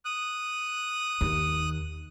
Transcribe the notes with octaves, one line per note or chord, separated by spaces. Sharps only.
D#6 F#6
D#2